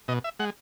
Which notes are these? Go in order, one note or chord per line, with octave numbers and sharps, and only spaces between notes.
B2 D#5
E5
G#3 F#5